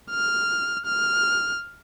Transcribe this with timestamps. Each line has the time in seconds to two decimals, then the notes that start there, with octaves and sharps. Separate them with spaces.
0.11 F6
0.86 F6